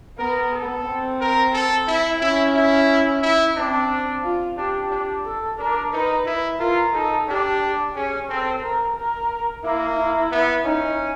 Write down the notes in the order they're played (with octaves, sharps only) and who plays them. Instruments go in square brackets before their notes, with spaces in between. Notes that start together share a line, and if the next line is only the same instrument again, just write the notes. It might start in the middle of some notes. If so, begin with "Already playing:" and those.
[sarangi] B3 [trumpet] A#4
[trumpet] A4
[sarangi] C4
[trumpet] A#4
A4
E4
[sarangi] C#4 [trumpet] E4
[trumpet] E4
E4
[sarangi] C4 [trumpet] D4
[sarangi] F4
[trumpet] D4 [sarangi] G4
[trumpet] D4
[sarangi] A4
[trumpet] D4 [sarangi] A#4
[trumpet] D#4 [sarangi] B4
[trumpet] E4
[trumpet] F4 [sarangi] A#4
[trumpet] D#4 [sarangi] A4
[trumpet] D4 [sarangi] G4
[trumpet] C#4 [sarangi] G#4
[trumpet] C4 [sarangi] A4
[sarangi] A#4
A#4
[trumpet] A#3 [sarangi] E4
[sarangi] E4
[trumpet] B3
[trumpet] C#4 [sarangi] D#4